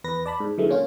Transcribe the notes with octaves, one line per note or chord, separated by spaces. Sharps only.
E2 B4 A#6
D5 A5 B5
G#2
F#2 D3 E3 G#3 A3
A#2 C#4 F4